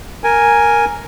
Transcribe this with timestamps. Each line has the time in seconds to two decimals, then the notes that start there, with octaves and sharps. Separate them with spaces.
0.24 A#4 G#5